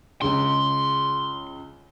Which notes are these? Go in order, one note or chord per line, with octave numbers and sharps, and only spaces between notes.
C#2 C#3 C6